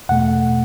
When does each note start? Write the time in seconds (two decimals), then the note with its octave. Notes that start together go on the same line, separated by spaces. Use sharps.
0.09 E2 B2 A3 F#5